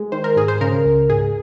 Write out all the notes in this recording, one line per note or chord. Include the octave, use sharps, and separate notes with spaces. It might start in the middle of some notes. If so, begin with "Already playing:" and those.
Already playing: G#3
D#3 C5
A#4
G#2 G#4
C5
C#3 A#4
C#2
G#2 G#4